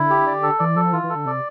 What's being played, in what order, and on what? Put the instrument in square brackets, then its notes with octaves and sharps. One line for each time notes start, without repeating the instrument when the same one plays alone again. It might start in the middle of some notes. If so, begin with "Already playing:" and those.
Already playing: [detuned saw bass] D3 [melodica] E4
[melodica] G4
D5
A4
[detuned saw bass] E3 [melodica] D5
[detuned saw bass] F3 [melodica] A4
[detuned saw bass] E3 [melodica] F4
[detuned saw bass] E3
[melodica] A4
[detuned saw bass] D3
[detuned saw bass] C3 [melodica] D5